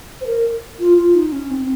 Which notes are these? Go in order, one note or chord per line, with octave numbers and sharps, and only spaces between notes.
C5
A#4
F4
F4
D#4
C#4
C4